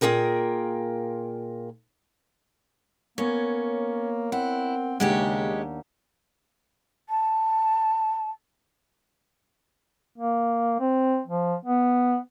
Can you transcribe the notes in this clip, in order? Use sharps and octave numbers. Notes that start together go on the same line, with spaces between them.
A#2 F4 G#4 A#4 G5
A#3 B3 C#4 A#4 C#5
C4 E4 F#5
D#2 C#3 G#3 C#4 D4 G4 F#5
A5
A#3
C4
F3
B3